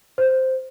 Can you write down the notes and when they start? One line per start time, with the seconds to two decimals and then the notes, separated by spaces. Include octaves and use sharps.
0.18 C5